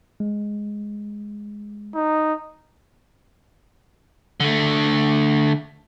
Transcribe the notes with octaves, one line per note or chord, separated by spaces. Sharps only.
G#3
D#4
D3 A3